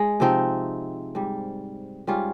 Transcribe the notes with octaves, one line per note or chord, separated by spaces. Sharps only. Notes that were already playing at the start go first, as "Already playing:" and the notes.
Already playing: G#3
C3 F3 C4 D#4
G#2 G3
G#2 G3 C#4 F4